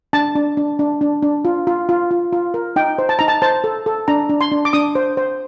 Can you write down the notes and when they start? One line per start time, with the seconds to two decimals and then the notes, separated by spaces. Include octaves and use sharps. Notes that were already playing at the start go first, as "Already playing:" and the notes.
0.13 D4 A5
0.35 D4
0.57 D4
0.79 D4
1.01 D4
1.23 D4
1.45 F4
1.67 F4
1.89 F4
2.11 F4
2.33 F4
2.54 A#4
2.76 D#4 G5
2.98 C5
3.09 A5
3.19 D#4 A#5
3.28 A5
3.42 C5 A5
3.64 A4
3.86 A4
4.08 D4 A#5
4.29 D4
4.41 C6
4.52 D4
4.65 D6
4.73 D4 D#6
4.95 C5
5.17 C5